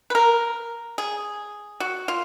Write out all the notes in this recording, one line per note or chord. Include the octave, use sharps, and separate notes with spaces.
B4
A#4
G#4
F#4
F4